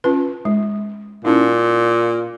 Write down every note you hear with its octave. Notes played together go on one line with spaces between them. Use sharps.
C#4 F4 B4
G#3
A#2 C#4 D#4 E4